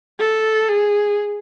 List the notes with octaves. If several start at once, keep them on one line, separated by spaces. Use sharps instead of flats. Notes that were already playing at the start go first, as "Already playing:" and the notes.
A4
G#4